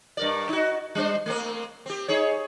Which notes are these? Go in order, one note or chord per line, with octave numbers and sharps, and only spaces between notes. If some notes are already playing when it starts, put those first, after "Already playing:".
G2 A#4 D5
D#4 F#4
G3 D4 C5
A3 A#3 C4
C4 G4
D#4 G#4 C#5